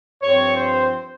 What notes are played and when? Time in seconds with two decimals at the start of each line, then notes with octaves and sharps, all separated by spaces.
0.22 G2 F3 C4 C#5
0.56 C5